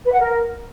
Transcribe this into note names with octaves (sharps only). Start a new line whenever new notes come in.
B4
F#5
A#4